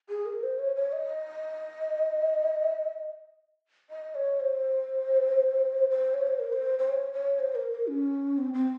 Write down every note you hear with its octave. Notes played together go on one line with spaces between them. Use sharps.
G#4
A#4
C5
C#5
C#5
D#5
D#5
C#5
C5
C5
C#5
C5
A#4
C5
C5
C#5
C#5
C5
A#4
A#4
C#4
C4
C4